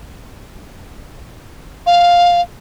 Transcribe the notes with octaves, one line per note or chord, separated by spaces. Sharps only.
F5